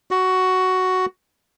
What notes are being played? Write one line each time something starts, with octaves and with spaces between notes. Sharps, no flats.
F#4